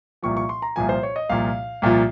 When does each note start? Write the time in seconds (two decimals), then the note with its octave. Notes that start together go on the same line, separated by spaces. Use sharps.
0.23 C2 A#2 F3 C#6
0.37 C#6
0.49 C6
0.62 A#5
0.76 C2 A#2 F3 G#5
0.89 C5
1.03 C#5
1.16 D#5
1.29 C2 A#2 F3 F5
1.82 C2 A#2 F3